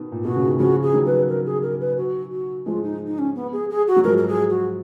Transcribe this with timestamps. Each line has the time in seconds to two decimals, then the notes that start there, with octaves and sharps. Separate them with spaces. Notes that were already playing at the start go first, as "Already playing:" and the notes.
Already playing: B2 D#3
0.12 A#2
0.24 B2 F#4
0.36 C#3
0.47 D#3
0.59 C#3 F3 F#4
0.82 G#4
0.94 D#3 F#3
1.06 B4
1.28 A#4
1.46 G#4
1.63 A#4
1.80 B4
1.97 F#4
2.31 F#4
2.66 F3 G#3 F4
2.84 D#4
3.07 D#4
3.19 C#4
3.35 B3
3.52 G#4
3.70 G#4
3.87 F#4
3.96 F#3
4.04 F3 G#3 A#4
4.17 A#4
4.28 G#4
4.50 F#4